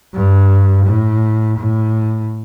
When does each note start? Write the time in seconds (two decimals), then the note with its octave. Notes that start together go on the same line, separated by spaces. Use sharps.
0.14 G2
0.86 A2
1.59 A2